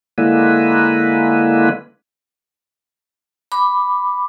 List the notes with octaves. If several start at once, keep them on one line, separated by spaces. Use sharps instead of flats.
D3 G#3 A#3 E4 B4
B5 D6